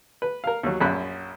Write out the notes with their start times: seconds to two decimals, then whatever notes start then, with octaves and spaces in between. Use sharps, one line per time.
0.22 B4
0.44 A#4 F5
0.63 D#2 F#3
0.80 A#1 F#2 B5 F#6